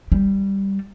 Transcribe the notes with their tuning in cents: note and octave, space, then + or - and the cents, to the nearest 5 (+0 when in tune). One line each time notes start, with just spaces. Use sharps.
G3 +0